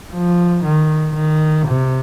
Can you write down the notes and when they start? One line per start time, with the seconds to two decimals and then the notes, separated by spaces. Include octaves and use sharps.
0.13 F3
0.65 D#3
1.15 D#3
1.67 C3